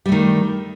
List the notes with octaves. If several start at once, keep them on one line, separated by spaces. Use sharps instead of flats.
D#3 G3 A3